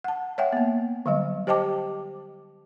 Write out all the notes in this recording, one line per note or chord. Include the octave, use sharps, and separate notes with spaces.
F#5 A5
C#5 E5 F#5 G5
A#3 B3
D3 F#3 G3 D#5
G4 C5 D#5 G5 A5 D6